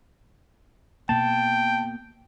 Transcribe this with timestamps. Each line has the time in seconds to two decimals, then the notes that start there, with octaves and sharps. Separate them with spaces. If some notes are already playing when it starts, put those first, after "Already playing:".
1.09 B2 A#3 G5 A5